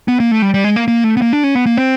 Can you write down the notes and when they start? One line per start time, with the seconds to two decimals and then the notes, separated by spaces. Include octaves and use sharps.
0.08 B3
0.20 A#3
0.31 A3
0.42 G3
0.54 G3
0.64 G#3
0.76 A#3
0.88 A#3
1.04 A3
1.17 B3
1.22 A#3
1.33 D4
1.44 C#4
1.55 B3
1.66 A#3
1.77 C4